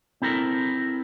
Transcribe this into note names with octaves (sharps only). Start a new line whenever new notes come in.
C4 E4 A4 A#4